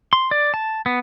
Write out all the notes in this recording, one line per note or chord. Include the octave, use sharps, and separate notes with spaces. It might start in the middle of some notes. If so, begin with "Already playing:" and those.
C6
D5
A5
B3